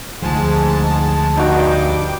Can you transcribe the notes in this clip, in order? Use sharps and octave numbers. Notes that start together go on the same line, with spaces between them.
D2 G#2 F3 G#3 A5
G2 D#4 F#4 G5 D6